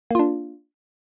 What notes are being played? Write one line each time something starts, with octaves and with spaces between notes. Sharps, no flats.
A#3 D4 F4